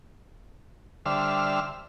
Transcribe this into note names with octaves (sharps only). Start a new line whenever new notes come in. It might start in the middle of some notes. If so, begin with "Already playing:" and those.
D3 G3 C5 E5 F6